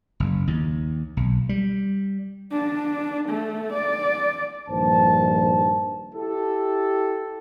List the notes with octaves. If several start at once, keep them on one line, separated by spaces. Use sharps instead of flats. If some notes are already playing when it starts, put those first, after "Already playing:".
F#1
D#2
B1
G3
D4
A3
D5
A#1 G2 D#3 C5 A5
E4 G4 A4